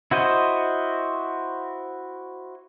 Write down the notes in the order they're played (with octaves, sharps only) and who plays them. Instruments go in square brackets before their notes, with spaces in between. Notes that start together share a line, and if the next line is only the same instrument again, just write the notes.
[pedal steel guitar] E4 F#4 C5 D#5